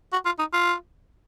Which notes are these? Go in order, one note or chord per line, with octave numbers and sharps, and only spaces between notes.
F#4
F4
D#4
F4